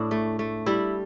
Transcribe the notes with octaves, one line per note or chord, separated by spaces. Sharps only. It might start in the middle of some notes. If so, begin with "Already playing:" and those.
Already playing: A2 D4 E4
A3
A3
G3 E4